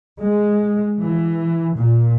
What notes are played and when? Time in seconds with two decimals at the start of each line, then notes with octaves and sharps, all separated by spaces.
0.21 G#3
1.02 E3
1.77 A#2